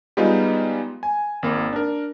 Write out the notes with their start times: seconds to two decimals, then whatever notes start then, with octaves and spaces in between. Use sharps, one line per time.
0.17 G3 G#3 B3 D#4 F4
1.03 G#5
1.43 G#1 A#3
1.73 D4 A#4